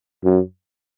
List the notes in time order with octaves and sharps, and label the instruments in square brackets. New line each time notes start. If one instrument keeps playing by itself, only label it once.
[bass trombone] F#2